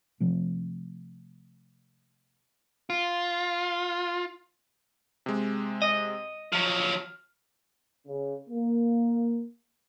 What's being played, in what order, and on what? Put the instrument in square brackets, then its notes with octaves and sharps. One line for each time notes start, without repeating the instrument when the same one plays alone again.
[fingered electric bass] C3 F3 A3
[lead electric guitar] F4
[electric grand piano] C3 G#3
[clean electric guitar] D#5
[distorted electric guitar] F3 F#3 [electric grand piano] F6
[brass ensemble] C#3
A#3